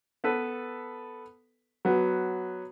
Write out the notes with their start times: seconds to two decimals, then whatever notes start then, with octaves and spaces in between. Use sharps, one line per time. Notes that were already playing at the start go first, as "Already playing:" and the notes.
0.24 B3 A4 B4
1.85 F#3 B3